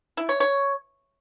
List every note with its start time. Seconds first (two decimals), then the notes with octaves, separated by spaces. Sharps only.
0.17 E4
0.29 C#5
0.40 C#5